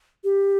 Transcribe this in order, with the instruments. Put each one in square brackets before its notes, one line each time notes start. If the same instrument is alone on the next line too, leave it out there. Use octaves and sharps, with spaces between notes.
[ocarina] G4